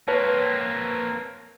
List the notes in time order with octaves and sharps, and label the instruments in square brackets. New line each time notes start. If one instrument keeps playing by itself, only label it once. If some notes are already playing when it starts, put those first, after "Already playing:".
[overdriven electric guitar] A#3 C4 [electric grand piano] B4 C#5 A5